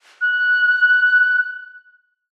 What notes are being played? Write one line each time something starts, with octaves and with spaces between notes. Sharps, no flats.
F#6